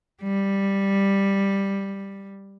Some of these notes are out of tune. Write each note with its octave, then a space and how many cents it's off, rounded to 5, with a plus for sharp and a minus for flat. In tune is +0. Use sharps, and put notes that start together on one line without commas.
G3 +5